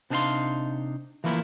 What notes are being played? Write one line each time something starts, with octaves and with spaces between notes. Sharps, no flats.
C3 D4 D#4 A#4 F5 C6
E3 F3 A3 A#3 E4